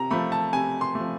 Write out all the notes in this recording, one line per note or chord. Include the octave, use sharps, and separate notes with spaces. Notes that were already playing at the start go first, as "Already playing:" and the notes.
Already playing: C3 A#5
F3 A3 B5
A5
C3 G#5
C6
F3 A3